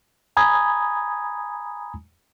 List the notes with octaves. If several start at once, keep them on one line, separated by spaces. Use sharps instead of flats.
G#5 A#5 B5 D#6 G#6